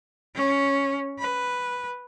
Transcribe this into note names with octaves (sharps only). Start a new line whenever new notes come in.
C#4
B4